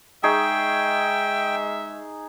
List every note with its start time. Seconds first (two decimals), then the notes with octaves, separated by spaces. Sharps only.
0.23 G#3 D#4 G#4 E5 G5 C#6